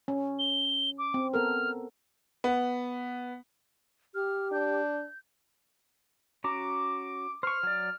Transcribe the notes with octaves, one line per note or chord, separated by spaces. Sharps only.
C#4
G7
D6
C4
B3 A4 A#4 F6
B3
G4 F6
D4 G6
C#4 F#4 A#5 D6
C5 C#6 F6
F#3 D5